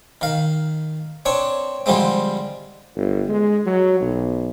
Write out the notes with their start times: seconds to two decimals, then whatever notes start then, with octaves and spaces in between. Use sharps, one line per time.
0.21 D#3 F5
1.26 C4 D4 C#5
1.86 D3 F3 G3 G#3 C4
2.96 G1
3.29 G#3
3.66 F#3
4.01 B1